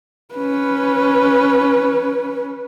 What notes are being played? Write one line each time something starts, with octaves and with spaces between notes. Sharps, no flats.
C#4 B4